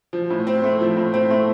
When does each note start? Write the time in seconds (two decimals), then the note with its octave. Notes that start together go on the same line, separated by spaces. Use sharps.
0.13 F3
0.30 A2
0.47 C4
0.63 A3
0.80 F3
0.97 A2
1.14 C4
1.30 A3